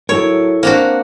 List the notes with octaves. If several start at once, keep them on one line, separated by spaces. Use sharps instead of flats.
F#3 E4 A4 A#4 C#5
A#3 C4 D4 F#4